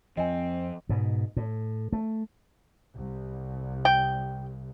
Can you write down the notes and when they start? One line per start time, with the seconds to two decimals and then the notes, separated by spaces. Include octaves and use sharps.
0.17 F2 F3 C4 D#5 G#5
0.89 G#2 B2
1.37 A2
1.93 A3
2.96 C2
3.85 G5